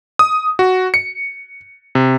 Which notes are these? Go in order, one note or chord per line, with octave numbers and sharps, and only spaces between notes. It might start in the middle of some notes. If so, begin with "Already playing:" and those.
D#6
F#4
C#7
C3